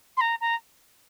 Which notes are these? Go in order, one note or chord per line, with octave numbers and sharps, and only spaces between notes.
C6
A#5
A#5